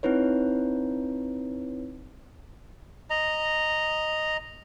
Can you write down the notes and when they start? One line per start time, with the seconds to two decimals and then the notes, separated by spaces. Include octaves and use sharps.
0.03 C4 D#4 E4 B4 C#5
3.10 D#5 A#5